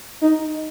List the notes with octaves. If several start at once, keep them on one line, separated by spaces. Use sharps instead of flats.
D#4